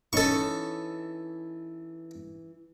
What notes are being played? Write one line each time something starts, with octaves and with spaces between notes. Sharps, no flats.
E3 C#4 D#4 A4 C#6